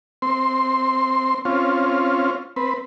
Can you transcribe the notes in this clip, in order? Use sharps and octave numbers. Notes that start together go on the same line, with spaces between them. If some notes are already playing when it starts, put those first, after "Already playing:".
C4 C6
C4 C#4 F4
C4 B4